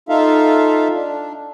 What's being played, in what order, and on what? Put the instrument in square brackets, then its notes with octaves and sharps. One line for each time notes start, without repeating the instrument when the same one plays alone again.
[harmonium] D#4 F4 A4 E5 F5
D4